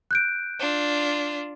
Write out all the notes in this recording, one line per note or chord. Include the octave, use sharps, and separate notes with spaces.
F#6 G6 D7
D4 F4